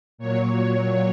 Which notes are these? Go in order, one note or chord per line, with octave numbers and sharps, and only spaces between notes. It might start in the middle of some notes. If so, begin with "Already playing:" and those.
A#2 F#3 C#5